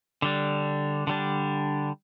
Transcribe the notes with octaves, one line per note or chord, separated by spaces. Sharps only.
D3 G3 D4
D3 G3 D4